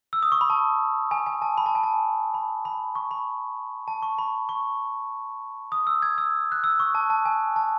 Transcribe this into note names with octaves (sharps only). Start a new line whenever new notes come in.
E6
D#6
C#6
B5
A5
G#5
G#5
A5
B5
A5
G#5
A5
B5
B5
C#6
B5
A5
C#6
B5
C#6
D#6
E6
G#6
E6
F#6
E6
C#6
A5
A5
G#5
A5